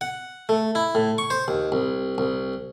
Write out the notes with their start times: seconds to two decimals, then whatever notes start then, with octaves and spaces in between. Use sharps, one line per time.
0.01 F#5
0.49 A3
0.75 E4
0.95 A2
1.18 C#6
1.30 C5
1.48 D#2
1.72 C2
2.18 C2